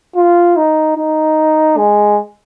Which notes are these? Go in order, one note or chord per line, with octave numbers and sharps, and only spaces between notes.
F4
D#4
D#4
G#3